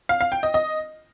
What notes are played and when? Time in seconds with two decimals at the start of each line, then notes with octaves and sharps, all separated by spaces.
0.09 F5
0.21 F5
0.32 G5
0.43 D#5
0.54 D#5